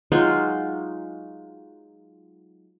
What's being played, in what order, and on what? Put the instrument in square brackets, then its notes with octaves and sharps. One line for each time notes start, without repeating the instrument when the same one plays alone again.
[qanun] F#3 G#3 D#4 F4